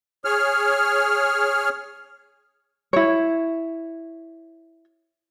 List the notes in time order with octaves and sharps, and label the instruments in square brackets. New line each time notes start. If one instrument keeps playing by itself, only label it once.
[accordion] G#4 C#5 F6
[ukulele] E4 C#5